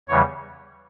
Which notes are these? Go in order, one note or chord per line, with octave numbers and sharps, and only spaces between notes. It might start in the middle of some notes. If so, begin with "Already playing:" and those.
E2 C#3 E3 G3 C#5